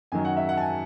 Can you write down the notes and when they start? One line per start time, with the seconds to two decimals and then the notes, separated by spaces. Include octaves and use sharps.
0.12 F#2 D#3 F#3 G#5
0.25 F#5
0.37 E5
0.49 F#5
0.57 A5
0.61 G#5